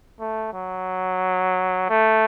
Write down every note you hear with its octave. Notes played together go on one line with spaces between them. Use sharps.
A3
F#3
A3